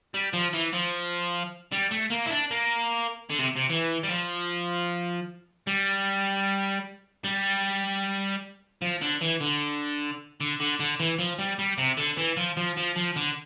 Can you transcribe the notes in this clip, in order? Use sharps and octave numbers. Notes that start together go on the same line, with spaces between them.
G3
F3
E3
F3
G3
A3
A#3
E4
D4
A#3
D3
C3
C3
E3
G3
F3
G3
G3
F3
D3
E3
D3
D3
D3
D3
E3
F3
G3
G3
C3
D3
E3
F3
F3
F3
F3
D3